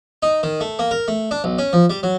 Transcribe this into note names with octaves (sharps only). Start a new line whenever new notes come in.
D#4
D#3
A3
A#3
A#4
A3
D4
B1
C#4
F3
G3
F#3